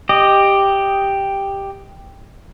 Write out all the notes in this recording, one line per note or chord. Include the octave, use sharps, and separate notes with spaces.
G4 D#5